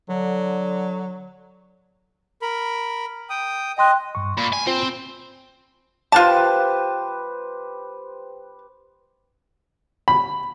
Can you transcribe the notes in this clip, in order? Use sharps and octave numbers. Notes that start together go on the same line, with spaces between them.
D3 F#3
A#4 B5
G5 D#6
D#5 G5 C6 F#6
G2 C#6
A#2 B5
G#5
C4 F4 C5
F4 G4 B4 C5 A5
B5